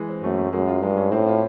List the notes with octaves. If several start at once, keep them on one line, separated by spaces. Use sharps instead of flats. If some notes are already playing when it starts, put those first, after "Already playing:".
Already playing: E3 G#3
C4
F#2 A3
A3
F#2 G#3
F4
G2 G#3
C#4
A2 C4
F4